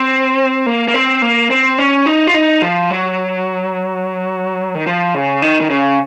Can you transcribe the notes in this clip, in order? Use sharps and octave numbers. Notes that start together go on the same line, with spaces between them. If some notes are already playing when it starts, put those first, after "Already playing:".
Already playing: C4
A#3
A#3
C4
A#3
C4
C#4
D#4
F4
D#4
F3
F#3
D#3
F3
C#3
D#3
D#3
C#3